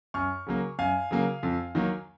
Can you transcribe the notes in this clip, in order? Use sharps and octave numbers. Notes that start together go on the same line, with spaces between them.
F#2 C#6 F6
C#3 F#3 A#3
F#2 F5 G#5
C#3 F#3 A#3
F2
D#3 F#3 A#3